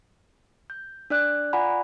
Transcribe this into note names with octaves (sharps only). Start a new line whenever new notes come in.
G6
D4 D5 F#6
F4 D5 F#5 G#5 A#5 B5